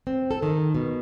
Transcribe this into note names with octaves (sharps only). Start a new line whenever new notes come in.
C4
A4
D#3
B2